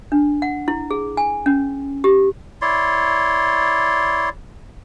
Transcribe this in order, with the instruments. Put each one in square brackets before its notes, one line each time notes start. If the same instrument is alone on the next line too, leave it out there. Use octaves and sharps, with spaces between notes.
[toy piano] D4
F#5
E4
G#4
G#5
C#4
G4
[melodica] E4 C#5 D5 C6